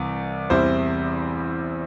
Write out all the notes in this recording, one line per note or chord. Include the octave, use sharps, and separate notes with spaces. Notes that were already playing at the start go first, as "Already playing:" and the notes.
Already playing: C2 C3 E3
E2 C3 G3 E4 C5